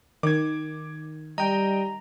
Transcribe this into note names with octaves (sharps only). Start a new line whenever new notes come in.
D#3 D6 G#6
G3 D#5 G5 A#5